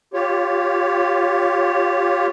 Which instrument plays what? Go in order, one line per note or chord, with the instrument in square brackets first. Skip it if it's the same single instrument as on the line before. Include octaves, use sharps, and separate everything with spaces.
[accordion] F4 G4 C#5